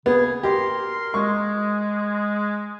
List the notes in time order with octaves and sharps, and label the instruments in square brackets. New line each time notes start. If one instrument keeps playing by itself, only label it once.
[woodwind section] C#3 G#4 [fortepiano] B3
[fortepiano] G4 [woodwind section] A#4 C6
[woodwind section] G#3 [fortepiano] C#6